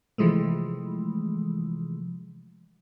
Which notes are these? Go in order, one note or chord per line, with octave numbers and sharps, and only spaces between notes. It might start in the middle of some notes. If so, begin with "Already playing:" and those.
C3 E3 F3 G#3 A3